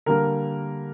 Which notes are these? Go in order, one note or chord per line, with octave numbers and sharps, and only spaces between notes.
D3 G3 A#3 A#4